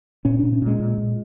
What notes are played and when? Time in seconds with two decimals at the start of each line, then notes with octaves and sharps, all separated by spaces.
0.25 A#2 C#4
0.39 A#2 D4
0.53 C#4
0.62 A#2 G#3
0.79 A#2
0.98 A#2